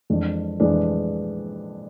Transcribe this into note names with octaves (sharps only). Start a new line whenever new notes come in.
F2 E3 G#3 D4
F2 E3 G#3 D4